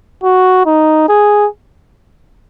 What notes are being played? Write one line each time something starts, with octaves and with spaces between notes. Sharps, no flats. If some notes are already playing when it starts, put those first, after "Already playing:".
F#4
D#4
G#4